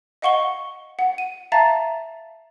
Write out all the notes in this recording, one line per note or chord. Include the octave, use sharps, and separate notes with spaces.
D#5 F5 F#5 C#6 C#7 G7
F#5
D#7
E5 F5 A5 A#5 A6